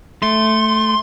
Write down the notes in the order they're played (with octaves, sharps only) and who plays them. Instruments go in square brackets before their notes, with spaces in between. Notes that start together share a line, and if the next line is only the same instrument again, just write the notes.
[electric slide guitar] A3 [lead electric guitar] C6